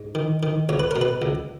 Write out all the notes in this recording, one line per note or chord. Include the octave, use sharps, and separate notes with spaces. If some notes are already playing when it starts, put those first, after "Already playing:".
Already playing: G#2
D#3
D#3
C#2 C#5
B4
B2 A#4
B4
C#2